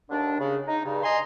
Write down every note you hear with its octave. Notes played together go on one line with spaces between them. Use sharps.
D#2 D3 D4
C#3
D#4
G2 C#3
D#5 G#5 A#5 C6